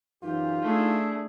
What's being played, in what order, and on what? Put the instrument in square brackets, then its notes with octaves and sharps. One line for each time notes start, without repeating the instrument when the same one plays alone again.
[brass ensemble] F#2 E3 G4 [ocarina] D#4 [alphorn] F4
[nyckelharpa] A3 G#4 [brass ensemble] D4 E4